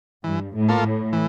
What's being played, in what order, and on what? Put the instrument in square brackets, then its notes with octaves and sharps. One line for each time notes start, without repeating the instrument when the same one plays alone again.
[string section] G2 [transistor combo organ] E3
[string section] A2
[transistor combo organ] A#3 F4 A4
[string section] A2
[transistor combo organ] E3